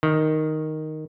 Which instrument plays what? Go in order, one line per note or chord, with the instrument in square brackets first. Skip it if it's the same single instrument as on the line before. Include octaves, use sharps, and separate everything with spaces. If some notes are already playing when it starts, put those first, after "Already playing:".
[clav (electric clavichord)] D#3